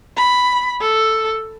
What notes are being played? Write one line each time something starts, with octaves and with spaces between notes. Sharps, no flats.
B5
A4